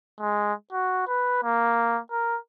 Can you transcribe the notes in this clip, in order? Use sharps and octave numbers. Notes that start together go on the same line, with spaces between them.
G#3
F#4
B4
A#3
A#4